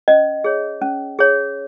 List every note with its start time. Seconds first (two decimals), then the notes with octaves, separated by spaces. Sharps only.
0.08 C#4 D#5
0.44 G#4 C#5
0.82 C#4
1.19 G#4 C#5